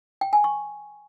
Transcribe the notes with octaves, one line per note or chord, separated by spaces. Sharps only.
G5
G#5
C#6